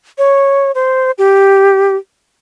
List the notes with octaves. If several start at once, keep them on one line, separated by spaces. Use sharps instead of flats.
C#5
C5
G4